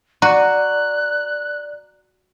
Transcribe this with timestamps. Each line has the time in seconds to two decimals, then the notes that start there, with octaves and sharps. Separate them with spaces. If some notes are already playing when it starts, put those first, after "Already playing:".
0.22 F#4 D5 A#5 F#6